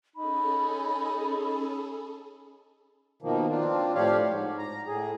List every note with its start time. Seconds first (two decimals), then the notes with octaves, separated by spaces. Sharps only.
0.16 C#4 D#4 G#4 A4 B5
3.22 B2 D#3 F3 A#3
3.49 C4 D4 F4
3.95 A2 F3 G4 C#5 D5 F5
4.27 G#2
4.58 A#5
4.87 A2 G#4